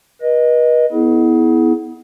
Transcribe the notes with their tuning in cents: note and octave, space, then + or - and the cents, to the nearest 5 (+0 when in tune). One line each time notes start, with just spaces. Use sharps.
B4 -40 D#5 +0
B3 +0 E4 -25 G#4 +25